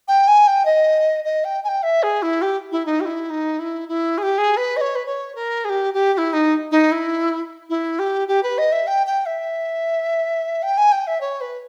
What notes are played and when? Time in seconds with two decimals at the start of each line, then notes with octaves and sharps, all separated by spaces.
0.08 G5
0.27 G#5
0.47 G5
0.65 D#5
1.24 D#5
1.44 G5
1.63 G#5
1.68 G5
1.82 E5
2.02 G#4
2.22 E4
2.41 G4
2.71 E4
2.85 D#4
3.00 G4
3.05 E4
3.29 D#4
3.58 E4
3.88 E4
4.17 G#4
4.22 G4
4.38 G#4
4.56 B4
4.76 D#5
4.80 C#5
4.95 B4
5.05 C#5
5.35 A#4
5.64 G#4
5.69 G4
5.93 G4
6.13 G4
6.17 E4
6.33 D#4
6.71 D#4
6.91 E4
7.69 E4
7.99 G4
8.28 G4
8.43 B4
8.58 D#5
8.72 E5
8.87 G5
9.06 G5
9.25 E5
10.62 G5
10.77 G#5
10.91 G5
11.07 E5
11.20 C#5
11.40 B4